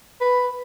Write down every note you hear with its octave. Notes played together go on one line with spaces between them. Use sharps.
B4